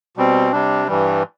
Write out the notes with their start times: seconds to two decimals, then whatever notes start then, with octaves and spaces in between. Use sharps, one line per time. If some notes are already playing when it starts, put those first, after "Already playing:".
0.17 B2 G3 C4
0.52 C3 G3 D4
0.87 G2 E3 G3